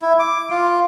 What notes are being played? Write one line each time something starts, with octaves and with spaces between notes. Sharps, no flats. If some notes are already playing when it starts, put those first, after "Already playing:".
E4
D6
F4